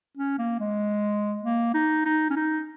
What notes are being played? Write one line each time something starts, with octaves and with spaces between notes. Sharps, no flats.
C#4
A#3
G#3
A#3
D#4
D#4
C#4
D#4